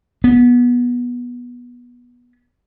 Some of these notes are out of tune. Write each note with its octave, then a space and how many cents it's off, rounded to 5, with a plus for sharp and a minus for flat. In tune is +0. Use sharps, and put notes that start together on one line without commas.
B3 -20